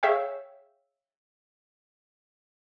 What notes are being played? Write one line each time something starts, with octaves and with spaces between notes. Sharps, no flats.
G#4 C#5 E5 F5 G5